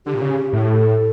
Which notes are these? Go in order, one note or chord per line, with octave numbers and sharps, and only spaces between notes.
D3 G4
A#2
C#3
A2 G4
A4